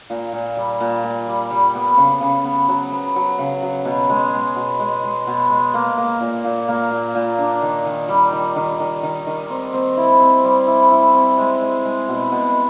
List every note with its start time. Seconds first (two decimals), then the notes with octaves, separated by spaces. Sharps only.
0.10 A#2
0.33 A#2
0.57 G3
0.80 A#2
1.04 A#2
1.28 G3
1.51 G3
1.75 B3
1.97 C#3
2.21 C#3
2.44 B3
2.69 F#3
2.92 B3
3.16 F#3
3.39 C#3
3.62 F#3
3.85 B2
4.10 G#3
4.33 G#3
4.56 B2
4.79 G#3
5.03 G#3
5.27 B2
5.50 G#3
5.74 A#3
5.98 A#3
6.21 A#2
6.45 A#2
6.68 A#3
6.91 A#2
7.15 A#2
7.38 D4
7.62 D#3
7.85 D#3
8.09 G3
8.32 D#3
8.56 D#3
8.80 D#3
9.03 D#3
9.27 D#3
9.50 C4
9.73 C4
9.97 E4
10.20 C4
10.44 G3
10.67 E4
10.91 E4
11.14 C4
11.38 G#3
11.61 G#3
11.85 G#3
12.09 B2
12.32 B2